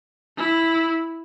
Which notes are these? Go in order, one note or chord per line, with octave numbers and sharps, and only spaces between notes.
E4